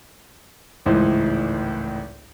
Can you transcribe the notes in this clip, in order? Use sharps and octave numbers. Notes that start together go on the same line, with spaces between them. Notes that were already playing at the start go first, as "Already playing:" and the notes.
G#1 C#2 A2 E3 D#4 C5